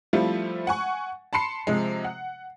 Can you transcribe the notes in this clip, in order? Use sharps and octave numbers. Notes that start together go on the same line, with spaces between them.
F3 G3 A3 C4 E4 F4
F#5 G#5 C#6
A5 B5 C6 C7 C#7
C3 F3 G#3
F#5